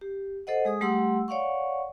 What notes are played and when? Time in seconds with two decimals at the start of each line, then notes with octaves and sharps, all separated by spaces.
0.01 G4
0.47 A4 C5 D#5 F#5
0.65 G#3 G#4 D#6
0.81 G3 A3 G4 F#5 C6 E6
1.28 C#5 D5 F5 F#5 C#6